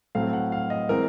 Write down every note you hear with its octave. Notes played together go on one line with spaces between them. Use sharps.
A2 F#3 A3 C4 F5
F#5
F5
D#5
E3 G#3 C4 A#4